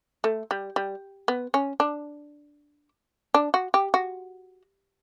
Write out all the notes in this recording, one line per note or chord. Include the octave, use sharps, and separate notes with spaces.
A3
G3
G3
B3
C#4
D4
D4
F#4
G4
F#4